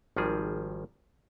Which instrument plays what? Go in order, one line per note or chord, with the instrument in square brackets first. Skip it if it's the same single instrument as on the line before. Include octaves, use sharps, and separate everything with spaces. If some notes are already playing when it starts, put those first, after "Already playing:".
[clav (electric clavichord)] G#1 D#3 F3 G3 G#4